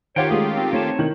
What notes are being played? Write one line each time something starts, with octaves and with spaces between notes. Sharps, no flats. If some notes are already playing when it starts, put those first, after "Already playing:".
D#3 F4 G4 C5 C#5 F#5 G5
G#3 A3 C#4 G#4
C4
A3 C4 D#4 C#5 A5
D#3 E4 F#7